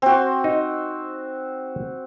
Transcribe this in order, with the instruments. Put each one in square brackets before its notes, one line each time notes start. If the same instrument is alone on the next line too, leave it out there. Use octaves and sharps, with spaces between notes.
[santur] C4 F#4
[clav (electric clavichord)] D#4